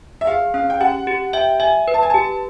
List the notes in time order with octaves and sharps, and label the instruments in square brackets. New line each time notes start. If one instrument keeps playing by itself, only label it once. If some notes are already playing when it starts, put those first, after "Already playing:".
[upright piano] E5
[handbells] G#4 [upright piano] F5
[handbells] C#4 [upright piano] F5
[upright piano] G5
[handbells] G4 [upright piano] F#5
[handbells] G4
[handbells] E5 [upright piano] G5
[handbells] E5 [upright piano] G#5
[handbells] B4
[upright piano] A5
G#5
[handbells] G4 [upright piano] A5